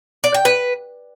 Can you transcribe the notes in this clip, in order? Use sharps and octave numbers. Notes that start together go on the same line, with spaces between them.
D5
G5
B4